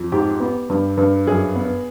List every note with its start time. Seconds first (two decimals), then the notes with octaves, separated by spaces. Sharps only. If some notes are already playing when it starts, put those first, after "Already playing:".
Already playing: F2
0.12 G#2 G4
0.40 B3
0.70 G2
0.97 G2
1.27 F#2 G#4
1.55 B3